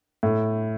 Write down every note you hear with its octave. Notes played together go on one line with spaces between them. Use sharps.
A2